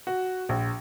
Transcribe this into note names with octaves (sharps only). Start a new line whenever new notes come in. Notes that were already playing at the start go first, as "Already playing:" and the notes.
F#4
A#1